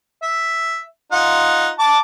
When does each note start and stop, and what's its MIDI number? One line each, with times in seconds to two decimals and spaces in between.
0.23 0.80 76
1.12 1.69 63
1.12 1.69 65
1.12 1.69 78
1.79 1.98 81
1.79 1.98 86